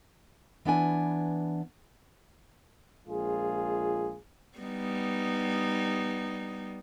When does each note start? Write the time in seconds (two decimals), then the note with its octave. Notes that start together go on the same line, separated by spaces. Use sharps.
0.65 E3 B3 D4 G#5
3.07 A#1 G#3 F4 G#4
4.59 G3 B3 D#4